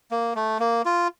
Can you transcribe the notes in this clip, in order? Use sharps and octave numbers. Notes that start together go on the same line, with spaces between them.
A#3
A3
A#3
F4